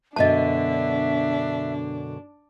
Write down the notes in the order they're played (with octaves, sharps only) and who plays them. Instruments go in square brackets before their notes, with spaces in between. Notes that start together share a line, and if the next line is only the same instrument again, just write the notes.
[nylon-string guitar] F#2 B2 D3 [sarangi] D4 [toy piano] D#5 A5 [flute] E5